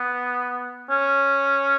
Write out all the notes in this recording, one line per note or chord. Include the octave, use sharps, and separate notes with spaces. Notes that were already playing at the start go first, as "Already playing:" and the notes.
Already playing: B3
C#4